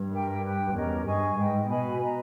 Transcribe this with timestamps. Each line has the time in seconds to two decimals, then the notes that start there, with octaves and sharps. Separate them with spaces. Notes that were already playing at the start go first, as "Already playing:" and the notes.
Already playing: G2
0.10 G4 A#4 E5 G5
0.42 G4 B4 G5
0.74 E2 C#4 G4 A#4 D#5
1.05 G2 G#4 D#5 G#5 C#6
1.37 G#2 B4 D#5 G5
1.69 B2 B4 D#5 G#5 B5
2.01 B4 D#5 A#5